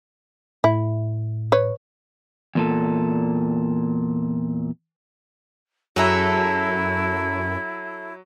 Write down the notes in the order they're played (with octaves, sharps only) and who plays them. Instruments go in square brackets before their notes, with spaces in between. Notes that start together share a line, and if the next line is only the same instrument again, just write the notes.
[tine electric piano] A2 [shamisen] E4
[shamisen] B4 C#5
[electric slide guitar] E2 A#2 A4
[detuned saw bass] F#2 [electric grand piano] F#3 A#5 [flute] E4 [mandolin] G#4 A4 E5